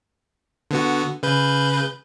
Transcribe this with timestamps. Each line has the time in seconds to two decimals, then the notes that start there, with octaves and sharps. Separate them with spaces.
0.71 D3 B3 F#4
1.23 C#3 B4 G6